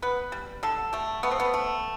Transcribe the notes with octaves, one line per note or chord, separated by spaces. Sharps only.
B3 B4
G3
D3 A4
A3 G4
A3 B3
C4
B3
A3